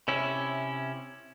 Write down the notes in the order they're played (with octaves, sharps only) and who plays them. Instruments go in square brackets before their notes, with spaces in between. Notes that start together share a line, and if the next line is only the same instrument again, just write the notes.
[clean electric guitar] C3 C#4 E4